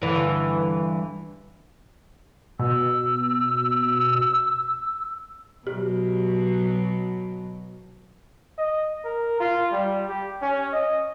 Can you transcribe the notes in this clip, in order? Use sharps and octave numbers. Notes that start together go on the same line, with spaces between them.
G2 D3 E3
B2 E6
B2 F#3 G4
D#5
A#4
F4
G3
G4
C#4
D#5